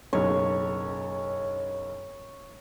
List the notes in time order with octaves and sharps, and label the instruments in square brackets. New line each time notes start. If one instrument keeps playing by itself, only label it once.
[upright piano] F#1 B1 [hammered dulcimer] C#5